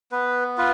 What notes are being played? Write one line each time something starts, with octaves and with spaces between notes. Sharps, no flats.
B3 B4
F4 B4